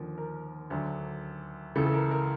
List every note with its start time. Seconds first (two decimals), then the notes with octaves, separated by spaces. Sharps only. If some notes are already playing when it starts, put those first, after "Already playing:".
Already playing: D#2 D3 F3
0.18 A#4
0.70 D2 D3 F#3
1.75 C#2 C#3 E3 A4
1.86 A4
1.94 A#4
2.11 A#4